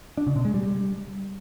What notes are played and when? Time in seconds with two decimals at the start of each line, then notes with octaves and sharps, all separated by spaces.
0.17 D4
0.27 C#3
0.36 B2
0.45 G#3
0.54 G3